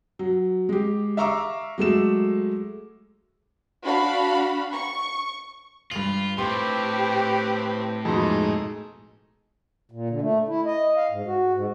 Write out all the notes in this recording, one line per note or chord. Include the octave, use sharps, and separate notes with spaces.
F#3
G#3 G4
E5 F5 A#5 C#6 D6 E6
F#3 G#3 A3 E7
D4 F#4 F5 F#5 B5
C#6
G2 F4 F7 F#7
A2 C4 G4 B4 C6
F2 G#2 B2 D#4 G#4 A4
A#2
D3
A3
E4
D#5
F5
G#2
F#4
G#2